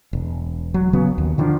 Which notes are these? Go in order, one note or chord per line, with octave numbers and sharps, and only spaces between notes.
E1
F#3
C#3 F#3 B3
D#2
D3 D#3 F3 D4